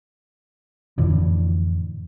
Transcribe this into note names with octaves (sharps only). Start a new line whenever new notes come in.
F2 A2 D3 E3